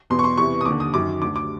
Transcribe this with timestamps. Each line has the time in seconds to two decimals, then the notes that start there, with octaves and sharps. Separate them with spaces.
0.10 E2 B2 C6
0.19 C#6
0.24 C6
0.37 E2 C3 E3 C#6
0.61 D#6
0.65 D#2 D3 D6
0.80 D#6
0.94 F#2 D#3 D6
1.22 D2 D3 D6
1.36 D6